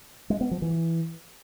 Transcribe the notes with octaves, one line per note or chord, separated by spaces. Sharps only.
G#3
B3
F3
E3